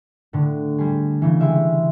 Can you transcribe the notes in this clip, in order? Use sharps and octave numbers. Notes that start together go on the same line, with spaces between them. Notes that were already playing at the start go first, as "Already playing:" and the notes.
A2 D3
G3 G#4
C#3 E3
G3 G#3 E5